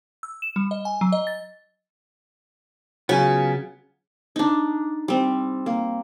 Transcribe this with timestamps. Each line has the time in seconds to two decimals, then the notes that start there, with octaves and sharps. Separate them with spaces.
0.23 E6
0.42 E7
0.56 G3
0.71 D#5
0.85 G#5
1.01 F#3
1.12 D#5
1.27 A6
3.09 C#3 F#3 B3 F4 G#5
4.36 D4 D#4
5.08 G3 C4
5.66 A#3